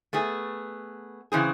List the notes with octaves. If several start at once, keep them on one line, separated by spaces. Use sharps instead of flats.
A3 B3 G#4
C#3 E3 C4 G#4